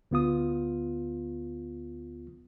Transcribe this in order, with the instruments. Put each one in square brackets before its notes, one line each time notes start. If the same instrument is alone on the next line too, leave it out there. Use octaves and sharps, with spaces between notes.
[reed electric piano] D2 B3 F4 D#6